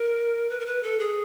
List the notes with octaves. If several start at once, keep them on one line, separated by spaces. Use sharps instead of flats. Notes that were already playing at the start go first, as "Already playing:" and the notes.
Already playing: A#4
B4
A#4
B4
A4
G#4